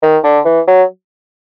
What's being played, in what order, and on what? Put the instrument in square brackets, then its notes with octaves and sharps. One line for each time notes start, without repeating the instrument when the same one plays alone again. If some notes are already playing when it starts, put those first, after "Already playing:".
[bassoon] D#3
D3
E3
F#3